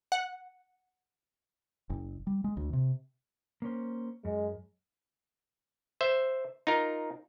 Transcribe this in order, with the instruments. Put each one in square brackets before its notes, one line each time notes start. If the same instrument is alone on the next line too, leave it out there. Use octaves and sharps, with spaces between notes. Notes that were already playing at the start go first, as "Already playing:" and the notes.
[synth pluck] F#5
[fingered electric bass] F#1
G3
G#3
D2
C3
[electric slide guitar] A#3 C#4 C5
[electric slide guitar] F#2 [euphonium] G#3
[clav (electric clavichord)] C5 E5
D#4 F4 A#4